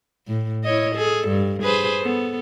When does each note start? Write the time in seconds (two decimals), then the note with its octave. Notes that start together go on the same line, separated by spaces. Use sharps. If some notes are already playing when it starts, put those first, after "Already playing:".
0.27 A2
0.64 E4 C#5 D#5
0.95 G#4 A4
1.28 G2
1.63 G#4 B4 C5
2.01 B3 A4